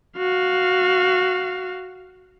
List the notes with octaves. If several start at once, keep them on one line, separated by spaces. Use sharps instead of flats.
F#4 F5